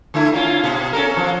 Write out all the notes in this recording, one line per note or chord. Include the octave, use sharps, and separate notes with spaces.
D3 A3 E4
A#3 C#4 F4
B2
C#4 A4 A#4
F3